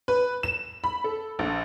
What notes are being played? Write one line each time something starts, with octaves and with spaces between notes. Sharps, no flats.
B4
E7
B5
A4
A#1